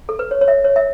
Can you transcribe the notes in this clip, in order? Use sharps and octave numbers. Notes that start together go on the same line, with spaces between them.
A4
B4
C#5
C#5
E5
C#5
E5